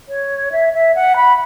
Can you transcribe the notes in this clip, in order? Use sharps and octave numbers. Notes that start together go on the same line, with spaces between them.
C#5
E5
E5
F#5
B5